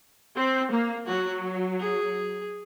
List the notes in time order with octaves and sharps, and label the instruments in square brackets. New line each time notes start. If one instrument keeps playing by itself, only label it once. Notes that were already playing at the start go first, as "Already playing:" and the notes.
[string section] C4
A#3
[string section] F#3 [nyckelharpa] F#4
[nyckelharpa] G#4